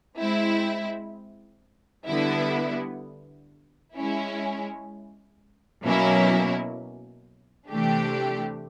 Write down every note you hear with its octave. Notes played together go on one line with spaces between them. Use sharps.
G#3 C4 E4
D3 G3 B3 E4
G#3 C#4 E4
B2 F#3 A#3 C#4 E4
C3 E3 A3 D4 G4